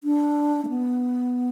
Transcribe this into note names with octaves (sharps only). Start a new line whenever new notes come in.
D4
A3
B3